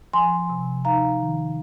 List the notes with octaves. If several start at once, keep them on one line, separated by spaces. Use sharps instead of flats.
F3 G#5 C6
C3
D#4 F5 A#5
D#3